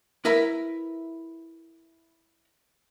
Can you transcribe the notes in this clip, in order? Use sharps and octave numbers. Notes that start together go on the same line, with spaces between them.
E4 A#4 B4 E5